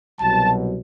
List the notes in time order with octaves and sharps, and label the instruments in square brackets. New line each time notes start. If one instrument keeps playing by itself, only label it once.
[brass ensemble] C2 B2 F#3 A5